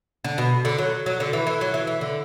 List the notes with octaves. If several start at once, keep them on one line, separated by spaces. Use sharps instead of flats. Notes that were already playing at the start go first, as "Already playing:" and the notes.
D3
B2
D3
F#3
F#3
D3
E3
E3
F#3
E3
E3
D3